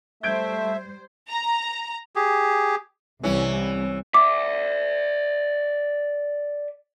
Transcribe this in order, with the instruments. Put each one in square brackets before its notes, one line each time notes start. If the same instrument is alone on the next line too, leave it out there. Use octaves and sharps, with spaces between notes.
[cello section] G3 C5 [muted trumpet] A3 [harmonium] E5 [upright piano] G6 G#6 D7
[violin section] A#5
[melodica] G4 G#4
[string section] C2 [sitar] E3 C#4
[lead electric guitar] D5 E5 [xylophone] D6